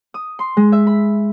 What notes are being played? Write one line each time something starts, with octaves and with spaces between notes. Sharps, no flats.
D#6
C6
G#3
E5
B5